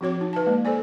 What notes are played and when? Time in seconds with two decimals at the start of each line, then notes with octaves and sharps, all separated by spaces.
0.01 F3 C4 F#4 C#5 D6
0.21 D#4
0.33 B4 A5
0.46 G#3 A#3
0.65 A4 C5 D5 G#5